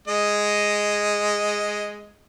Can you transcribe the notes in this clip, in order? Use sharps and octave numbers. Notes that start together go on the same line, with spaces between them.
G#3 D#5